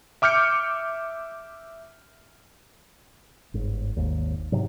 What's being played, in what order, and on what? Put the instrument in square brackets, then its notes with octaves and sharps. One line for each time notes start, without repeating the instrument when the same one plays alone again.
[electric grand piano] E5 D6 F6 G6 C#7
[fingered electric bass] G1 G#2
G#1 D#2
G#2 C3 F#3